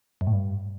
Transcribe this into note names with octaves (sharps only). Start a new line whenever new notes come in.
F#2
A2
G2